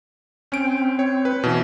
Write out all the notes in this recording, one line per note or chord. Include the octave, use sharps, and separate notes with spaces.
C4 C#4 D7
C#5
B4
B2 E3